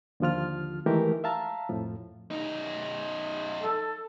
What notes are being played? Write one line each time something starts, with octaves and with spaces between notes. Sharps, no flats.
D#2 D3 F3 F4 F6
D#3 E3 G#3 A3 G4 A#4
E5 F5 A5 A#5
F2 A2 F3
F#2 D#4
A4